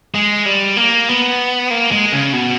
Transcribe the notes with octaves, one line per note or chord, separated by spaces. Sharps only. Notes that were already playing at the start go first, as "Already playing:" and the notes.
G#3
G3
A#3
B3
A#3
G#3
C#3
B2